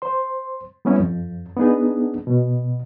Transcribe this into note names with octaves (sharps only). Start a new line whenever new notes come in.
C5 C6
G3 B3 C#4 E4
F2
B3 D4 D#4 G#4
B2